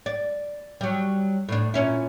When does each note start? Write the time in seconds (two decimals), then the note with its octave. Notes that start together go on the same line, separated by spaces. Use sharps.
0.06 D5
0.81 F#3 G3
1.49 A2 D4
1.74 A#2 C#4 E4